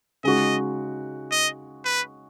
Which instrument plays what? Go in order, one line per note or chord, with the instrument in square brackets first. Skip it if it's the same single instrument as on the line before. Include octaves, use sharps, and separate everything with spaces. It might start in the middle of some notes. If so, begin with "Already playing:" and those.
[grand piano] C#3 G#3 D#4 F#4 [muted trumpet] D#5
[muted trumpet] D#5
B4